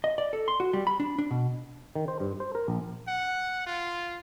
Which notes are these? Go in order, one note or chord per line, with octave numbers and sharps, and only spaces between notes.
D#5
D5
A4
C6
F#4
G3
B5
D4
D4
B2
D#3
C5
G2
C5
A#4
A#1
F#5
F4